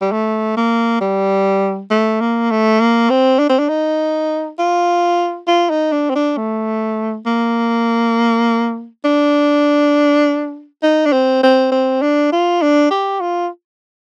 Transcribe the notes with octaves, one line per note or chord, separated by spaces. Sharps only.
G3
A3
A#3
G3
A3
A#3
A3
A#3
C4
D4
C4
D4
D#4
F4
F4
D#4
D4
C4
D4
A3
A#3
D4
D#4
D4
C4
C4
C4
D4
F4
D4
G4
F4